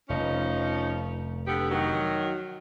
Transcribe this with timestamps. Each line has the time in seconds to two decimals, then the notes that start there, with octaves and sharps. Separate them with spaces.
0.09 F1 F3 C#4 D#4
1.47 D3 B3 G4
1.71 D#3 F#3